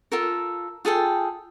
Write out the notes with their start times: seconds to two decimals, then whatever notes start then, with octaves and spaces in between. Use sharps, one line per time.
0.12 F4 A4 A#4
0.85 F4 G#4 A4 G5